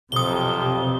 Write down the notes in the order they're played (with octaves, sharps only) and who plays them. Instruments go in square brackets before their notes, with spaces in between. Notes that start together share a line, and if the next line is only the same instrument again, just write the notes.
[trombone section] B1 F2 [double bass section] C3 [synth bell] D#6 G7